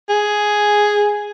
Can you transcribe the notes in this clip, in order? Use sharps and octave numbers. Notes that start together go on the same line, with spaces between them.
G#4